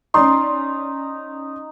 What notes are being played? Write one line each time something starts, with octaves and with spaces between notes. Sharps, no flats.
C#4 D#4 D5 C6